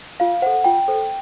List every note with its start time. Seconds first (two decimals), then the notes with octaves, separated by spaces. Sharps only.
0.20 F4 F5
0.42 A4 C5 F#5
0.64 F4 G5
0.88 A4 C5